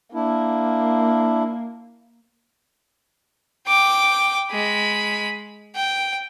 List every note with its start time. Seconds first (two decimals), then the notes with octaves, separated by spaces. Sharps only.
0.14 A#3 D4 E4
3.67 G5 D6
4.51 G#3 B5
5.76 G5